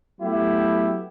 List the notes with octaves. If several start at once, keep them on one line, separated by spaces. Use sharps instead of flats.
F#3 A3 B3 E4 G4